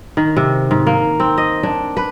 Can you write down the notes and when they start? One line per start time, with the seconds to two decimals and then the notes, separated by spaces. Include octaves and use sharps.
0.17 D#3
0.37 C3
0.71 G#2
0.87 A#3
1.20 C4
1.38 D#5
1.63 D4
1.97 B4